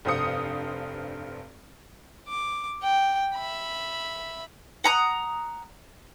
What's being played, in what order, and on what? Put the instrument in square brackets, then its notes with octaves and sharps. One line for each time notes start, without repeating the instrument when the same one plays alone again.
[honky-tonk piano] F1 G2 C5 F5 D#6 C#7
[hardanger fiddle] D6
G5
E5 B5
[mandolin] F#5 A#5 D#6